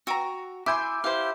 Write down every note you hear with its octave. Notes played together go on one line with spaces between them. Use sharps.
F#4 G5 A#5 C#6 E6
E4 E5 G#5 C6 D6 E6 G6
E4 G4 C5 F5